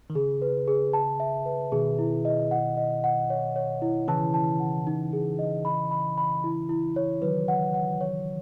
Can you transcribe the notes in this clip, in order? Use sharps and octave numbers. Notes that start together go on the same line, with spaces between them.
D#3
C#3 G#4
B4
G#4
A5
E5
B4
B2 D#3 G#4
E4
D#5
F#5
D#5
F#5
C#5
C#5
E4
C#3 E3 A5
A5
F#5
D#4
G#4
D#5
B5
B5
B5
E4
E4
C#5
D#3 F#3 B4
F#5
F#5
C#5